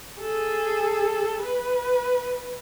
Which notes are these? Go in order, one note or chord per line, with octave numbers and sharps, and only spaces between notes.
G#4 A4
B4